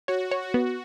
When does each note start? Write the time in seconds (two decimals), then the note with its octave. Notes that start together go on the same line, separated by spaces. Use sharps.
0.08 F#4 C#5
0.31 C#5
0.42 F#4
0.54 B3